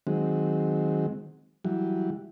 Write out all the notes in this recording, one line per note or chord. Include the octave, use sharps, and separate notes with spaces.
D#3 F#3 G#3 C4
E3 F#3 G3